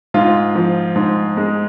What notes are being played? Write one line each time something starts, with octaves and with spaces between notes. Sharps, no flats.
G#2 F4
F3
G#2
G#3